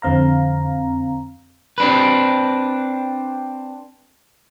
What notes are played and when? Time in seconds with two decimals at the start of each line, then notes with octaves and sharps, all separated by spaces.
0.02 F2 D3 C4 F5 A#5
1.78 C4 D4 B4